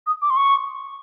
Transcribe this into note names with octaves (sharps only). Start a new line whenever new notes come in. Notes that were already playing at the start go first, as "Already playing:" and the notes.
D#6
D6
C6
C#6